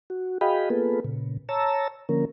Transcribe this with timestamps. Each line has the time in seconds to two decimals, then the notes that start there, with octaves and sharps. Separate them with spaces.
0.10 F#4
0.41 F#4 G#4 D#5 F5 G5 B5
0.70 A#3 B3 F4 G#4 A4 B4
1.04 A#2 C#3
1.49 C#5 A5 A#5 E6
2.09 D3 F3 A#3 C#4 A#4